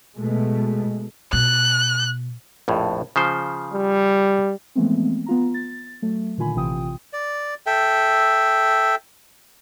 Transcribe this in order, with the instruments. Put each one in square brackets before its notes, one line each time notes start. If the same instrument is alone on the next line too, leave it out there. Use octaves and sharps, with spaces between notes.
[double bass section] B2 G#3 A3
[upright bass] B2 [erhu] F#6
[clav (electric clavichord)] A#1 F2 A2
C#3 F3 C5
[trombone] G3
[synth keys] E3 F3 G#3 A3 B3 C4
B3 F4 A#5
A6
F#3 A3
A#2 D3 D#3 F4 G#5 B5
A1 C3 E3 F4 G5 D#6
[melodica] D5
A4 E5 G5